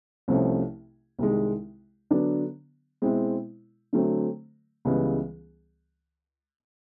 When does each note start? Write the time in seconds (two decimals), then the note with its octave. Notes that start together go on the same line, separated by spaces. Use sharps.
0.28 C2 C3 F3 A3 C#4
1.19 C2 C3 D#3 G#3
2.11 D3 F#3 B3 D4
3.02 B2 G#3 C4 E4
3.93 D3 F#3 A3 C4
4.85 C#2 C#3 E3 G3 B3